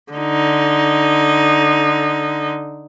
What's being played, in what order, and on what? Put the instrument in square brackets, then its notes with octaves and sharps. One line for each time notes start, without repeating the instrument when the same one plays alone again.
[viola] D3 D#4